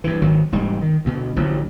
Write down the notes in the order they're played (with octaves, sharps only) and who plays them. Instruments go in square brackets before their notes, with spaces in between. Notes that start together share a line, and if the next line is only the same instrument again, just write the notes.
[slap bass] G2 E3
G#1 D#3 F#3
E1 G#2 G3 G#3
D#3
D2 B2
A1 D2 F3 F#3